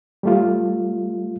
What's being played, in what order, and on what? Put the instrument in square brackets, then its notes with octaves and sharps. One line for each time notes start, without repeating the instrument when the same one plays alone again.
[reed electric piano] G3 A3 F4